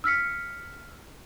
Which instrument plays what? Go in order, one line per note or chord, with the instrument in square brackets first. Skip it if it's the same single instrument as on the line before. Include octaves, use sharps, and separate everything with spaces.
[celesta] E6 F6 B6 C#7